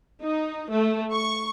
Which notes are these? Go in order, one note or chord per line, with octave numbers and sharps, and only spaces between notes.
D#4
A3
C#6